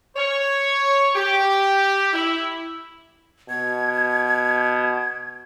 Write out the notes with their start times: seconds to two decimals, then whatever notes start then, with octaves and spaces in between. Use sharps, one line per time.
0.16 C#5
1.16 G4
2.13 E4
3.49 B2 G#6